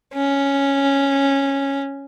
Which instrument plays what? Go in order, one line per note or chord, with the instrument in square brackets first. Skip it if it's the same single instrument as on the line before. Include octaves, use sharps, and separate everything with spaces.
[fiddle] C#4